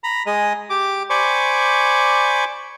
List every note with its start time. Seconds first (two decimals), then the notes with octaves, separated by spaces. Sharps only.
0.04 A#5 B5
0.27 G#3 G#4 D#5 D#6
0.70 G4 D6
1.10 C5 D5 G#5 B5 C#6 D6